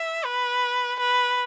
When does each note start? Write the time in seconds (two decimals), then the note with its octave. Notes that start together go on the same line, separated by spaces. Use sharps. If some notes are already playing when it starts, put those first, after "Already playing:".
Already playing: E5
0.25 B4
0.99 B4